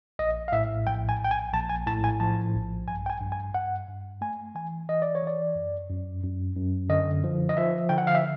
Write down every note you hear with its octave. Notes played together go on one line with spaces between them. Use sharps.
A#1 D#5
F5
A2 E5
A#1 G5
G#5
A#1 G5
G#5
A#1 A5
G#5
A2 A5
G#5
F3 A5
A#1
G2 G#5
G5
G#5
G2
G#5
G2 F#5
G2
A3 G#5
E3 G#5
E3 D#5
D5
C#5
E3 D5
F#2
F#2
F#2
F#2
D3 D#5
F3
D#5
F3 E5
D3 G5
F#5
F5
E5